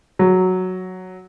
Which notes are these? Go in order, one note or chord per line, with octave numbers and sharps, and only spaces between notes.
F#3